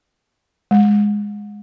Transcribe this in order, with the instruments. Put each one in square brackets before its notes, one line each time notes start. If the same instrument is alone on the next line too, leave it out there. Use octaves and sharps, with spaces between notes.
[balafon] G#3